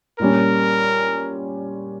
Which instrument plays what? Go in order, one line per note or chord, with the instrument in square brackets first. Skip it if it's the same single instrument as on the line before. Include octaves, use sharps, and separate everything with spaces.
[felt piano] A#2 G3 C#4 [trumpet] A#4